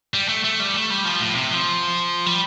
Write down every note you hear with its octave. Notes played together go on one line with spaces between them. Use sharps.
G3
A3
A3
G3
A3
G3
F3
A2
C3
F3
G3